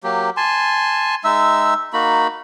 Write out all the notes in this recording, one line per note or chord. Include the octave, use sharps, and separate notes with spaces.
F#3 A#3 G4
G#5 A5 C6
G#3 D#4 E5 E6
A#3 D#4 F#4 B5